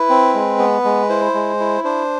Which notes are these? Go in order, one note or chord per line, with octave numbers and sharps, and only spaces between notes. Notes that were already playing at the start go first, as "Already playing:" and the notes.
Already playing: E4 B4
C4
G#3
B3
G#3
E4 C5
G#3
E4
D4 C5